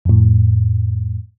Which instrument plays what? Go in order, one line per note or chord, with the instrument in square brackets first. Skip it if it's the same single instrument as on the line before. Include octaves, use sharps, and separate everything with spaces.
[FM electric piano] F2 A2